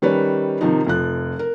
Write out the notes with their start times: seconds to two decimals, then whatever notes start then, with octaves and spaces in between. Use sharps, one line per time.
0.02 D#3 G3 C#4 B4 C#5
0.61 C3 D#3 F3 D#4
0.86 F1 F3 F#6
1.39 A#4